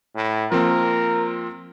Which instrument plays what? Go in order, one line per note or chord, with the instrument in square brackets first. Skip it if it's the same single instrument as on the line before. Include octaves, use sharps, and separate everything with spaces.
[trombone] A2
[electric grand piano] F3 A#3 C4 [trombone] A#4